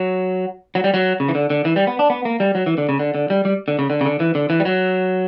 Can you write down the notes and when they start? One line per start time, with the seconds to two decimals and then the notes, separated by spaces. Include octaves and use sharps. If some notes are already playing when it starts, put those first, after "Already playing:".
Already playing: F#3
0.75 F#3
0.84 G3
0.94 F#3
1.20 C#3
1.29 E3
1.35 D3
1.50 D3
1.65 E3
1.76 G3
1.87 B3
1.99 D4
2.10 B3
2.25 A#3
2.40 G3
2.55 F#3
2.66 E3
2.78 D3
2.89 C#3
2.99 D3
3.15 D3
3.30 G3
3.45 G3
3.68 D3
3.79 C#3
3.90 D3
4.01 C#3
4.05 D3
4.20 E3
4.35 D3
4.50 E3
4.60 G3
4.65 F#3